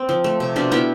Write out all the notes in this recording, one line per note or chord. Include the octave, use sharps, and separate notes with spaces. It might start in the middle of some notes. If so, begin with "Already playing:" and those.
Already playing: C4
F3
A3
C3
B2 D4 F4
B3 E4 G4